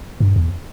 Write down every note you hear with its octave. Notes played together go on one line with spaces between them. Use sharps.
G2
E2